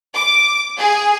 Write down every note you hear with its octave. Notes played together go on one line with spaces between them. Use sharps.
D6
G#4